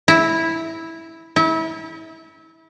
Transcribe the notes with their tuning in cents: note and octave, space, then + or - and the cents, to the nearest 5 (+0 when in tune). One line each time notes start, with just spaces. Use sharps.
E4 -10
E4 -30